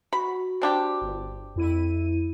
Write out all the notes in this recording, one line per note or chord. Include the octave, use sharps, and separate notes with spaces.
F#4 B5
C4 D4 G4
G1
F2 E4 D#7